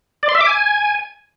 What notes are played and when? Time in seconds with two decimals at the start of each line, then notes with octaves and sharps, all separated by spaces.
0.23 D5
0.29 C6
0.35 E5
0.41 D6
0.47 G#5